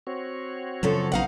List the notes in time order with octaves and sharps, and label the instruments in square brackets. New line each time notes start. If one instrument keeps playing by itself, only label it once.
[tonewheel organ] C4 F#4 C#5
[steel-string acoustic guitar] F#2 F3 A4 [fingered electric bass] C#3 F#3
[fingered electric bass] A#1 F#3 [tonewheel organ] C#3 B3 [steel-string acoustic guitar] D#4 F5 F#5